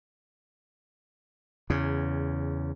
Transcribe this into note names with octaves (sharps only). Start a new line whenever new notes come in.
E2 C#3